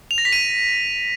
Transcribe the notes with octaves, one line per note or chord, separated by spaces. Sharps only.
F7
A#6
B6
D#7